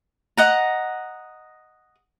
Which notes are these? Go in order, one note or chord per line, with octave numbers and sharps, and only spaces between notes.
D#5 F#5 A#5